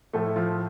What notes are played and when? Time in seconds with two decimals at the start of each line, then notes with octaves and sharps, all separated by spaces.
0.13 A2 F3 A3 A4
0.26 E4
0.36 F3 F4